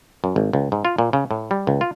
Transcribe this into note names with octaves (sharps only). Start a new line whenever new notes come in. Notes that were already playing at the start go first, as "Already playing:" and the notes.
F#2
G#1
C#2
G#2
F4
A#2
C#3
A2
G3
C#2
F4